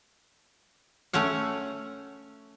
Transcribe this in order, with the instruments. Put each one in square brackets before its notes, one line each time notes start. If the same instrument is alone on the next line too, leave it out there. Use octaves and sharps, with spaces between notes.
[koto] A3 C#4 C#5 F#5